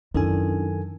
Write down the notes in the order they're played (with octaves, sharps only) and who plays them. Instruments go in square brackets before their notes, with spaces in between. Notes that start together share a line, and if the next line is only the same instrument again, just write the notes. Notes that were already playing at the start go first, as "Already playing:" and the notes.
[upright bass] F#2 [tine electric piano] D#3 A4 G#5 [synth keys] C#4 D4 E4